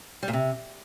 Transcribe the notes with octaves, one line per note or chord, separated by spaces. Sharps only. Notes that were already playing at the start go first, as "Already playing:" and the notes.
G3
A#2
C3